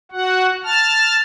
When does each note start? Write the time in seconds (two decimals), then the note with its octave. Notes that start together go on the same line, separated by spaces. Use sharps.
0.12 F#4 F#5
0.64 A5 F6